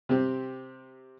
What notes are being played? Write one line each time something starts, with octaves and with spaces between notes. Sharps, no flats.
C3 C4 G4